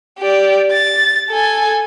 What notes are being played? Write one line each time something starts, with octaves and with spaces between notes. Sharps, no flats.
G4 D5
A6
A4 G#5